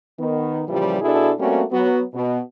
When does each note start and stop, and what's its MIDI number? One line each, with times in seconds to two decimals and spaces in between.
0.20 0.64 51
0.20 0.64 59
0.68 0.99 46
0.68 0.99 49
0.68 0.99 52
0.68 0.99 53
0.68 0.99 55
1.01 1.33 47
1.01 1.33 62
1.01 1.33 64
1.01 1.33 66
1.01 1.33 68
1.01 1.33 69
1.40 1.63 55
1.40 1.63 57
1.40 1.63 58
1.40 1.63 60
1.40 1.63 61
1.40 1.63 66
1.72 2.03 54
1.72 2.03 59
1.72 2.03 66
2.14 2.39 47